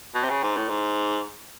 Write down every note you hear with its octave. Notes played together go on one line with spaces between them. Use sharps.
B2
C3
C#3
G#2
A2
G#2